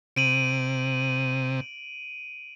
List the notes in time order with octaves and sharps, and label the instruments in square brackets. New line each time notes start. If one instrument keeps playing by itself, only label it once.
[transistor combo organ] C3 [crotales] D7 D#7 F#7